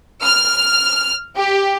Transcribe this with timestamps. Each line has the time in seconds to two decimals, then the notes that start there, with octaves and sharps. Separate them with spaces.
0.23 F6
1.36 G4